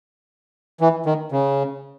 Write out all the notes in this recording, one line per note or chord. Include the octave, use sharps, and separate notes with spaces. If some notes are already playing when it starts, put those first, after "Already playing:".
E3
D#3
C#3